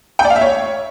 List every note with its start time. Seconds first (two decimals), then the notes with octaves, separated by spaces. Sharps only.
0.19 G5
0.25 D5
0.30 F5
0.36 E5
0.41 C#5